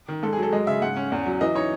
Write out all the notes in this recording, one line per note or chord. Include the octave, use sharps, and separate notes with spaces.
D#3
G#2 A4
G#4
F#3
A4
G#3 D#5
C#3 E5
G#2 F#5
C#4
E2
F#3
E3 D#5
D#4 C#5